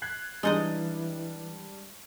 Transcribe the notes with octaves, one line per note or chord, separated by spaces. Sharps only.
F#6 G#6 C7
E3 G3 G#3 D4 D#4 D#5 A6